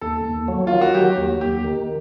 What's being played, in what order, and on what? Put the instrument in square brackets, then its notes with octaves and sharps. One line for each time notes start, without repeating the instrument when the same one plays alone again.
[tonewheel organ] D#2 [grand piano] A4
[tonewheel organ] D#2
F#3
[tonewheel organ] D#3 [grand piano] F4
[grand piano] F#4
[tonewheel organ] F#3 [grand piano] G4
[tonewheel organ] D#2
[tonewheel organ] D#2 [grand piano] G4
[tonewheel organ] D#3